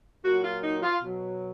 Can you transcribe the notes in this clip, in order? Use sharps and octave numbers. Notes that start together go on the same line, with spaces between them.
A#2 F#3 F#4
F4
D#4
F4
B2 F#3